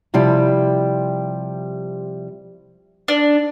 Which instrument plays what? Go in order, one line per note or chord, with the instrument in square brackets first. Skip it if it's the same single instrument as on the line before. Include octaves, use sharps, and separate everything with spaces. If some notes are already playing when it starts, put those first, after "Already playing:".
[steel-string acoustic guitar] C3 F3 G3 E4 G4
[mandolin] D4